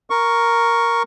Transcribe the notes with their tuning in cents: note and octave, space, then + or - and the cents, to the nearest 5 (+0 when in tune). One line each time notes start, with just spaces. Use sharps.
A#4 +0 C#6 +0